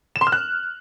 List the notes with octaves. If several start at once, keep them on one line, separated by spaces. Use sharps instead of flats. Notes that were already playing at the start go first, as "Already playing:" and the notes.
E7
C6
F6
F#6